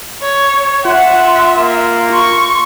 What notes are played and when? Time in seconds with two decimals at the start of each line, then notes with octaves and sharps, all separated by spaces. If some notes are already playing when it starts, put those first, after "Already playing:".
0.21 C#5
0.85 F4 E5 F#5 C6
1.56 A#3
2.12 C6 C#6